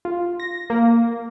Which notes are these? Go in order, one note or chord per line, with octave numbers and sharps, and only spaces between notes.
F4
A#6
A#3